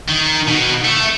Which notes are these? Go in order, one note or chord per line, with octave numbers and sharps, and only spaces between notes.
D#3
B2
A3